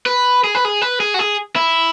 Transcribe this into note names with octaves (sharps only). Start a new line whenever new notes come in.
B4
G#4
B4
G#4
B4
G#4
F#4
G#4
E4